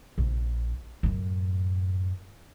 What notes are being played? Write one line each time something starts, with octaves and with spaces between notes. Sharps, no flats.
A#1
F#2 A2